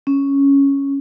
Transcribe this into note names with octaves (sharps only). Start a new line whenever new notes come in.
C#4